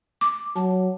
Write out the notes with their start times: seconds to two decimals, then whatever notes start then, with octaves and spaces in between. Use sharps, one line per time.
0.21 D6
0.56 F#3 A5